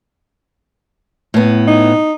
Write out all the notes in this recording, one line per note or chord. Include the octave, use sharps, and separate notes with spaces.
A2 B3
D#4